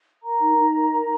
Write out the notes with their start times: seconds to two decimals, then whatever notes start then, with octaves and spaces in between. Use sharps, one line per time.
0.23 A#4 A#5
0.39 D#4
0.57 D#4
0.75 A#4
0.91 A#4